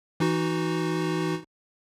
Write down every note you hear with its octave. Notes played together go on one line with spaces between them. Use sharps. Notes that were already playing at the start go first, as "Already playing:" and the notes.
E3 D#4 F#4